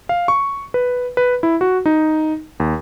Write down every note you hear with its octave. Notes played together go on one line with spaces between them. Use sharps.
F5
C#6
B4
B4
E4
F#4
D#4
D#2